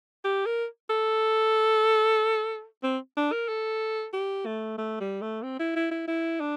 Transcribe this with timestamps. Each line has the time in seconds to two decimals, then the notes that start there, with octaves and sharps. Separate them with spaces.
0.24 G4
0.46 A#4
0.90 A4
2.83 C4
3.17 D4
3.32 A#4
3.48 A4
4.13 G4
4.45 A3
4.78 A3
5.00 G3
5.21 A3
5.43 C4
5.59 E4
5.76 E4
5.91 E4
6.08 E4
6.40 D4